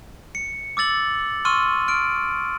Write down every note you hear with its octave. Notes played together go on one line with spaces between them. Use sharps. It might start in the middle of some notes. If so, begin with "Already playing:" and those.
C#7
D6 E6 A6 F#7
C6 C#6 E6 F6 D#7
F6 D7